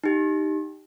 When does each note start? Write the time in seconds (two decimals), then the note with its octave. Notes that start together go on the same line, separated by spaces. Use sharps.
0.04 D#4 G4